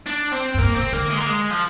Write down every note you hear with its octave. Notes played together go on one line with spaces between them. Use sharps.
D4
C4
F2
G2 A#3
A#2 C4
D3 A#3
G#3
A#3
G#3
F3